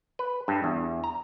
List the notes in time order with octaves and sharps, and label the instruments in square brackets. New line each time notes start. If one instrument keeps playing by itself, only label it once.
[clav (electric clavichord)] B4
G2
E2
A#5